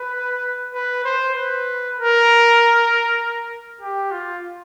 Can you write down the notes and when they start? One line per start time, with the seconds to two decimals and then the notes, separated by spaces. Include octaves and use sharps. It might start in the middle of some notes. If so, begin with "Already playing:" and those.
Already playing: B4
0.74 B4
1.04 C5
1.35 B4
1.97 A#4
3.81 G4
4.11 F4